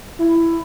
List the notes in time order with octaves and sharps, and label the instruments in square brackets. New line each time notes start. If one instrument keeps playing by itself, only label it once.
[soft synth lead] E4